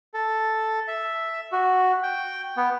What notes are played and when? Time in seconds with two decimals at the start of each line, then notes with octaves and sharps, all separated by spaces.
0.14 A4
0.88 E5
1.52 F#4
2.03 G5
2.57 B3